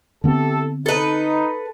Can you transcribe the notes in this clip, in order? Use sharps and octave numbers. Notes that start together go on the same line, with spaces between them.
D3 B3 C4 E4 G4 A4
D#4 A4 B4